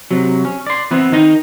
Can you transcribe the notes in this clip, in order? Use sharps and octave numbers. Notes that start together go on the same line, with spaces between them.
C3 F#3
C#4
D5 C6
E3 B3 C4 E4
D#3 D#4 D#5